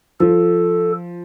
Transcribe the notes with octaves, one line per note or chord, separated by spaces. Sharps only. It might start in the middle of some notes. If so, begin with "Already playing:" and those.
F3 A4